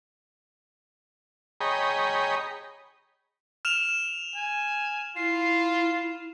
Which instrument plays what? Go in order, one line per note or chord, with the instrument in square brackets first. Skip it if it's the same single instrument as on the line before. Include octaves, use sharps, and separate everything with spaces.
[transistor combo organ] G#4 C#5 D#5 G5 A#5 B5
[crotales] F6 E7 F7
[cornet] G#5
[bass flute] E4 [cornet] F4 [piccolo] C7